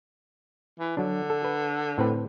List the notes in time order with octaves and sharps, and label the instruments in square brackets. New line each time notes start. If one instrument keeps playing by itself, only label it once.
[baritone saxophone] E3
[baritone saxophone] D3 [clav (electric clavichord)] F#3 D4
[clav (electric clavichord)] A4
B4
A2 C4 B4